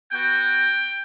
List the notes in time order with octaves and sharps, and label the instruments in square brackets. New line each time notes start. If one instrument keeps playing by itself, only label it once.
[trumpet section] B3 F#4 G5